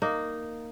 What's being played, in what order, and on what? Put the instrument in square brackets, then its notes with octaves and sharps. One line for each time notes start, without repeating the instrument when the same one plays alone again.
[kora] A#3 D#4